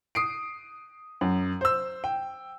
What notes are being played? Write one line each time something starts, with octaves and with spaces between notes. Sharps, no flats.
D#6 C7 D7
F#2
C5 E6
G5